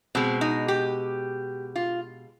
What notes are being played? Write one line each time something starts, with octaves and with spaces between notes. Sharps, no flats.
B2 G#3 C4
D#4
G4
F4